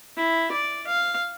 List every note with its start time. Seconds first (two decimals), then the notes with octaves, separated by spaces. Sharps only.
0.17 E4
0.52 D5
0.87 F5